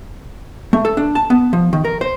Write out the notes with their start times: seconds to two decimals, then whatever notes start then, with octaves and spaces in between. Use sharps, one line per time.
0.73 A3
0.85 A4
0.97 D4
1.15 A5
1.30 B3
1.53 F3
1.73 D#3
1.85 A#4
2.01 C5